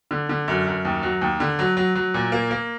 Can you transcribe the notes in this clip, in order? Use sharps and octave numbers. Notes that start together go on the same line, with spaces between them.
D3
D3
F#2
F#2
D#2
F#3
D#2
D3
F#3
F#3
F#3
A#2
A#3
A#3